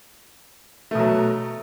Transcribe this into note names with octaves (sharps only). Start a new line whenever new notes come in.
B2 F#3 A3